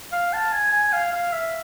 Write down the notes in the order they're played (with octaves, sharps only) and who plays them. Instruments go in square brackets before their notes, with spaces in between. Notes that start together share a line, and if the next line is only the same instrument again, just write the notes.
[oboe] F5
A5
G#5
G#5
F5
F5
E5